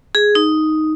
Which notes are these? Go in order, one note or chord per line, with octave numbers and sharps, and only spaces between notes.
G#4
D#4